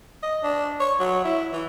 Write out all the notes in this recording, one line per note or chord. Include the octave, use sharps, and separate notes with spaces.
D#5
D4
C#5
F#3
E4
E3